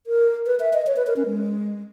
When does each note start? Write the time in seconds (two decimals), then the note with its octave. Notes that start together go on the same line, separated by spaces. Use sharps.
0.07 A#4
0.46 B4
0.60 E5
0.73 D#5
0.87 C#5
0.96 B4
1.07 A#4
1.16 C#4
1.26 G#3